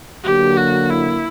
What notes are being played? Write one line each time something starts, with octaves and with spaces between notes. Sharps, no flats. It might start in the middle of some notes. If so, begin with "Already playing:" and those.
D3 F#3 A#3 G4
F#4
E4